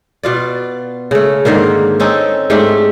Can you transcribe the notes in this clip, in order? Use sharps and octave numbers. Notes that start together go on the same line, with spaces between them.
B2 F4 D5
C#3 A3
G#2 D3 D#3 A#3
C4 C#4 D#4 A4
G#2 A3 D4 G4